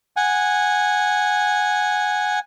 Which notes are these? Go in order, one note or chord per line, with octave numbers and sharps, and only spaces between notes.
F#5 G#5